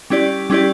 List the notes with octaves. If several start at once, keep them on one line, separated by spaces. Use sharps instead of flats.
G3 C#4 E4 G4 D5
G3 C#4 E4 G4 D5